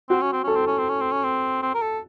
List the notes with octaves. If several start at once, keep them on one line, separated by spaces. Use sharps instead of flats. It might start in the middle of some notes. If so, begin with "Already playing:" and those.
C4 F#4
C#4
C4
C#4 A4
C4
C#4
C4
C#4
C4
C#4
C4
C4
A#4
A4